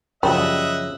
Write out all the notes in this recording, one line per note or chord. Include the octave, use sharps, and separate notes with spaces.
F#2 C#3 F3 G3 D#5 E5 F#5